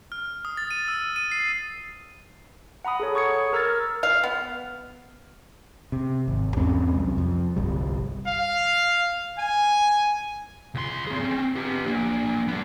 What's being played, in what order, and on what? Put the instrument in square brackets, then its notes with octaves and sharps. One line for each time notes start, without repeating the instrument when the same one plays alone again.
[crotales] F6
D#6
A6
D#7
E6
D#7
C7
[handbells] F#5 A#5 B5 D#6
G#4 A4 C#5
C#6 D#6 G#6 C#7
A#4 A#5 E6 F6 G#6 A6
[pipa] F5
B3
[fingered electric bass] C3
G#1
E2 G#2 C4 C#4
C2 F#2
F2
G1 C2 G3
[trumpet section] F5
G#5
[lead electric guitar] C#2 C6
C4 G#4
C4 C#4
B3 G4
A#3 D4
G3 B3